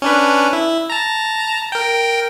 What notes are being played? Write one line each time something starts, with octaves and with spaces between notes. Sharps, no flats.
C#4 D4 B4
E4
A5 A#5
A#4 G5